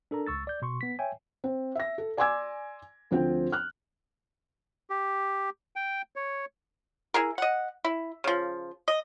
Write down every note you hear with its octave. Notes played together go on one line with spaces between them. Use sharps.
D4 A4 A#4 A#5
C#2 C#6 E6 A6
D5 G6
B2 C6 C#6
B3 B6
C#5 E5 G5 G#5
C4
E5 A#6
A4
D5 G#5 C6 D6 E6 G#6
D2 F3 C4 C5 G5
F6 F#6
G4
G5
C#5
E4 G#4 A#4
D#5 F#5
E4
C#3 F3
D#5